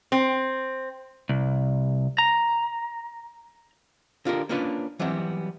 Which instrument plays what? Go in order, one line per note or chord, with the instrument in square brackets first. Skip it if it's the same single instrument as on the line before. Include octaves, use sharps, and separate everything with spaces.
[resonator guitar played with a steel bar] C4
[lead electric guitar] C2
A#5
[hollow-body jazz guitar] D3 F4 G4 A#4
A#3 C#4 D4 F4 B4
E3 F#3 G3 B3 C4